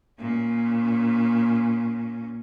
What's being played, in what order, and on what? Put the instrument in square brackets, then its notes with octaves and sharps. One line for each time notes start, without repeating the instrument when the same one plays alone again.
[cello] A#2 C#4